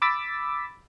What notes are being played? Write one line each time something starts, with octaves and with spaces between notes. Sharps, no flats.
B5 D6 E6 A6 B6